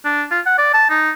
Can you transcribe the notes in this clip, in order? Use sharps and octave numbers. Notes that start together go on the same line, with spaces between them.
D4
F4
F#5
D5
A5
D#4